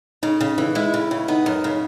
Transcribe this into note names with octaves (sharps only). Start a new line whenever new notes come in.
C#3 D#4
C#3
E3
G#3 E4
C#3
C#3
B3 D#4
F#2
C#3